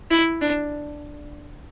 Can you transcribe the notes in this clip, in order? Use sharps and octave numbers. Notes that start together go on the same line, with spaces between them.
E4
D4